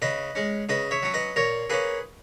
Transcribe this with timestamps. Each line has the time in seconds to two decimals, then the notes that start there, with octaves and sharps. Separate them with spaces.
0.02 C#3 B4 D#5
0.35 G#3 C#4
0.69 C#3 B4 D#5
0.91 C#5 E5
1.02 F#3 C#4
1.14 B4 D#5
1.36 A#2 A#4 C#5
1.70 A#3 C#4 G#4 B4